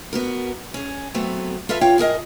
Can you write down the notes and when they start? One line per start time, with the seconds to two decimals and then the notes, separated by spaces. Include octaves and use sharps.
0.13 B3 F#4 A#4
0.74 C#4 G#4
1.14 F#3 A3 B3 C4
1.69 F4 A4 B4 E5 F5
1.81 F4 C#5 F5 G5
1.98 A2 G#4 A#4 D#5